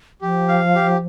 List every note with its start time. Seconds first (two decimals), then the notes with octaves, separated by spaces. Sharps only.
0.21 F3 G4
0.48 F5
0.75 G4